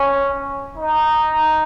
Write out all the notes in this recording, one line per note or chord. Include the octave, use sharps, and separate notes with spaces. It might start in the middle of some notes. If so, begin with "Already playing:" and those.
Already playing: C#4
D#4